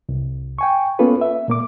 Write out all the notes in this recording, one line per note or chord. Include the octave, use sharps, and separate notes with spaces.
C2
G5 G#5 C#6
A#3 B3 C#4 F4 A4 B4
E5
A#2 A#3 D6